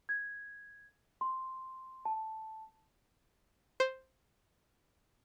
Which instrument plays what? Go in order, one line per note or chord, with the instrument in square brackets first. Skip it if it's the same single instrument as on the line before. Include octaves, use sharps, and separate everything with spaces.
[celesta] G#6
C6
A5
[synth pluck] C5